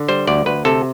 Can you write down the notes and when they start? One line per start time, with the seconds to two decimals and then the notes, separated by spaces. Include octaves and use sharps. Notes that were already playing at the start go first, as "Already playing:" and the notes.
Already playing: D3
0.09 G3 C5
0.27 D2 D5
0.46 D2 B4
0.65 C3 A4